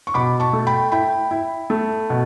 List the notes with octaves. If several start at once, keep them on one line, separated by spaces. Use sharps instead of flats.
C#6
B2 B5 D6
A5 C#6
A3
G5 B5
E4 G5 B5
E4
A3
B2